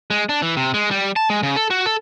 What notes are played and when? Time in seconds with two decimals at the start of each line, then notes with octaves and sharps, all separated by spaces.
0.11 G#3
0.29 D4
0.42 E3
0.57 C3
0.74 G#3
0.91 G3
1.16 A5
1.30 G#3
1.43 C#3
1.56 A4
1.70 F#4
1.86 A4